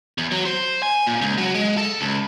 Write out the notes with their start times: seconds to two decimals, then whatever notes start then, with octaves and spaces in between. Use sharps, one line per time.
0.18 E2
0.32 F#3
0.45 C5
0.83 G#5
1.07 A#2
1.21 C#2
1.38 F#3
1.55 G#3
1.77 A4
2.01 C#2